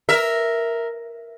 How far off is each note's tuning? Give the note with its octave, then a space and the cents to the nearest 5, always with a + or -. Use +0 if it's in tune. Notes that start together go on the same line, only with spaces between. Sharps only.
A#4 +0 E5 +0